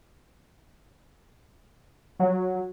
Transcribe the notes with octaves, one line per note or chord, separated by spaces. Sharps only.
F#3